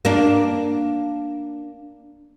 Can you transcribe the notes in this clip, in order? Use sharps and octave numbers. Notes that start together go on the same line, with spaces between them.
A#3 D4